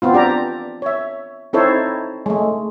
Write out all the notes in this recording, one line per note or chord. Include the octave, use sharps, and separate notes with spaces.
B3 C4 F4
D4 G4 D5 A#5
C#5 E5
C4 D#4 E4 A4 C5 C#5
G#3 A3